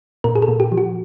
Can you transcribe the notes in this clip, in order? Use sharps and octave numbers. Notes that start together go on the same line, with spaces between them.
A#2 A#4
G#4
A4
A#2
G4
F3
F#4